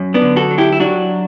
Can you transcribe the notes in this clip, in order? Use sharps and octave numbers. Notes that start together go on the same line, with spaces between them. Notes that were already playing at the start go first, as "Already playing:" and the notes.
Already playing: F#2
B3 D4
D3
F#4 A4
F#3
E4 G4
E4
F#3 D4 F#4